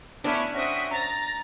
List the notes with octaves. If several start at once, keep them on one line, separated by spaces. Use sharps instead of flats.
A3 B3 C#4 D4 E4
C4 C#4 F#4 E5 D#6
A#5 A6